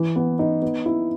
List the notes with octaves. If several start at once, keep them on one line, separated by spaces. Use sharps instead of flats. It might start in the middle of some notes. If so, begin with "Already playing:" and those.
Already playing: E3
B3
D#4
B3
E4